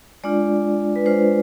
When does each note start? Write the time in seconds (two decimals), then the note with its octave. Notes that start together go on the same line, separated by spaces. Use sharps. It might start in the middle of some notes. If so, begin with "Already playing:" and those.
0.24 G#3 D4 F4 D5
0.96 B4
1.06 G#3 D4 F4 C5